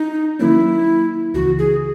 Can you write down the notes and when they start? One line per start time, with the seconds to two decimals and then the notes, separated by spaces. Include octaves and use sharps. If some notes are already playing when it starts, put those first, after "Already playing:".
Already playing: D#4
0.39 D#3 F#3 A#3 C#4 E4
1.34 C#2 C#3 E3 F#4
1.58 G#4